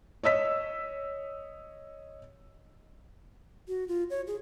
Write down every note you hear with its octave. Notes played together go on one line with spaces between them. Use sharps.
C#5 D#5 E6 B6
F#4
F4
C#5
G#4